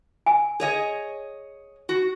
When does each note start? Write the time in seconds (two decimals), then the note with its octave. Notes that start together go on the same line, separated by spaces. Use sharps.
0.26 G#5
0.60 G#4 C#5 D#5
1.89 F#4